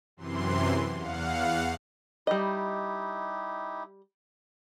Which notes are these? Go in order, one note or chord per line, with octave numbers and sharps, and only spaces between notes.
F#2 C3 E3 C6
E2 F5 F#5
G3 D#4 E4 G4 D#5